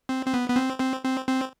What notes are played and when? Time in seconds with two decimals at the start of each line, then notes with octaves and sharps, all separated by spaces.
0.09 C4
0.26 C4
0.34 B3
0.49 B3
0.56 C4
0.80 C4
1.04 C4
1.28 C4